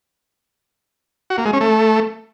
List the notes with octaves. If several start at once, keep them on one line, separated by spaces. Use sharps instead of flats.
F#4
A#3
G#3
C#4
A3